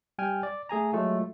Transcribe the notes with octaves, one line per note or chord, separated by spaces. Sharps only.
G3 G5 G#5 F6
D5
A3 G#4 G#5 A#5
F#3 G#3 A3 F4